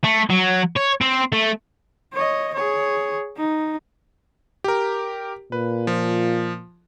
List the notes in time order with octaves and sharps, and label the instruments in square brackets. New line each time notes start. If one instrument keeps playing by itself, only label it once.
[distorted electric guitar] A3
F#3
C#5
C4
A3
[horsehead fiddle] C#5 D#5
G#4 C#5
D#4
[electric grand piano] G4 A#4
[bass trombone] A#2 [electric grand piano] B4
[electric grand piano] F3